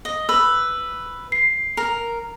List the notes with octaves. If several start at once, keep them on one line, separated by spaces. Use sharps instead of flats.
D#5
B4 E6
C7
A#4